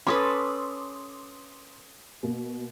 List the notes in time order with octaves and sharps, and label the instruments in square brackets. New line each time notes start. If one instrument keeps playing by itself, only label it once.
[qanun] C#4 A4 B4 [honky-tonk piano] C6 D6 D#6
[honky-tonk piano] B2 A#3